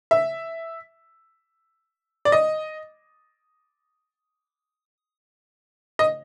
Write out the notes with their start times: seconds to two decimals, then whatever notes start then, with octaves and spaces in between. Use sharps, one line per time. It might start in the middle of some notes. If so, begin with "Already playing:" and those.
0.11 E5
2.25 D5
2.32 D#5
5.99 D#5